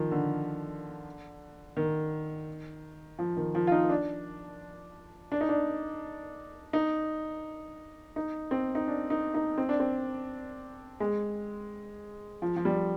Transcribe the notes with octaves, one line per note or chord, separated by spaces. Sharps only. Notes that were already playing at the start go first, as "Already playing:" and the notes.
Already playing: D#3 F3
D3
D#3
F3
D#3
F3
F4
D#4
D4
D4
D#4
D4
D#4
D#4
C4
D#4
D4
D#4
D#4
C4
D4
C4
G#3
F3
F3
G3